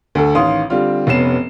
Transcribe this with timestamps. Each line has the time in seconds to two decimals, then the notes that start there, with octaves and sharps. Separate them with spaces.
0.15 D2 A4
0.35 A1 D#3 F5 C6 D#6
0.70 D3 G3 C4 F4
1.07 F1 B3 C#4 C7 E7